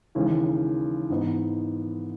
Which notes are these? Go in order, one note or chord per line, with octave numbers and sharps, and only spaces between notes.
D#2 C#3 E3 G#3 C#4
G#2 E3 B3 D#4